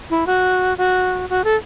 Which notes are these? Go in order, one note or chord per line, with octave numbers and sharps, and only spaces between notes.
E4
F#4
F#4
F#4
A4